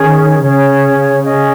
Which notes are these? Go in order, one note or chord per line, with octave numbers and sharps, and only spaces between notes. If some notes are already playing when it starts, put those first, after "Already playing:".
Already playing: D#3 C#4 G#4 C#5
C#3 C#4 G#4 C#5
C#4 G#4 D#5